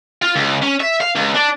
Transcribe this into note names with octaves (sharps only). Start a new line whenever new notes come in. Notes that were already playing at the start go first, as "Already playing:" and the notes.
F4
C#2
C#4
E5
F5
C#2
D4